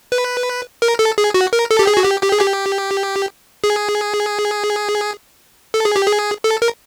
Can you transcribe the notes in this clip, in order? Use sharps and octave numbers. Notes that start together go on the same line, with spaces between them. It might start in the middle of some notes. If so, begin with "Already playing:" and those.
B4
A#4
A4
G#4
F#4
A#4
A4
G4
G#4
F#4
G4
G4
G#4
G4
G#4
A4
G#4
G4
G#4
A4
A#4